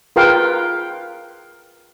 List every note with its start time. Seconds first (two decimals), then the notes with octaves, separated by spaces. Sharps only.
0.16 F4 G#4 A#4 B4 F5 G5